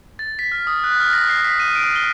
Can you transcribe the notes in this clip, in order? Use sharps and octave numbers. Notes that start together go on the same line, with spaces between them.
A6
B6
F6
D#6
F#6
F6
A#6
C7
B6
D#7
D7
G7